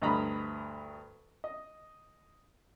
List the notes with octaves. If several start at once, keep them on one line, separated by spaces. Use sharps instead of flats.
D2 G2 D#5 A#5 B5
D#5